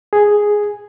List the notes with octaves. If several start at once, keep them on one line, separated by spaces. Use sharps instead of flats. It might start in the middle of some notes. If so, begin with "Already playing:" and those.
G#4